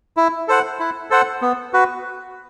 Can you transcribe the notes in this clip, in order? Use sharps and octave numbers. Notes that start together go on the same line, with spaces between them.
E4
A4 C5 F#5
E4
A4 C5 F#5
B3
F#4 B4